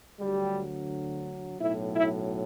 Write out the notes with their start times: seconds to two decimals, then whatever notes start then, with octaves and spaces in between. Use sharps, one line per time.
0.20 D2 D3 F#3 G3 G4
1.60 B1 A2 F#3 E4 E5
1.95 E4 E5